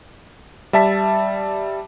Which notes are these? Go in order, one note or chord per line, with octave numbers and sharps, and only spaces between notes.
G3 E5 A5 B6